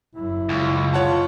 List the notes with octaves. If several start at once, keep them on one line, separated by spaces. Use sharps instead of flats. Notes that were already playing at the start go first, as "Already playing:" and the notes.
F#1 F#2 E4
C#2
F4 C#5 F#5 A5